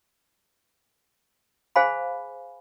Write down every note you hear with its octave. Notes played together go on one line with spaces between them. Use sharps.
G#4 C5 F5 G#5 B5